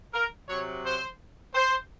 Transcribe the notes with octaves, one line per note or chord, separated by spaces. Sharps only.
A#4
C3 F#3 C#5
C5
C5